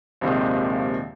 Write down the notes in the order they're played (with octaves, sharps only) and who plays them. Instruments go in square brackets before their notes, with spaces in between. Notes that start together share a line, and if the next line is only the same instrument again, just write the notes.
[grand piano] A#1 D#2 C3 D#3 F3 G#3